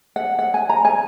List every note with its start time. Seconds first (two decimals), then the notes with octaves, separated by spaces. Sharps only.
0.16 F#5
0.39 F#5
0.54 G#5
0.69 A#5
0.85 G#5